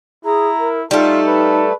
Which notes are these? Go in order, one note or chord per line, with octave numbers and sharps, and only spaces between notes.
E4 G#4 A#5
A#4
G3 A3 D#4 F4 A4
B4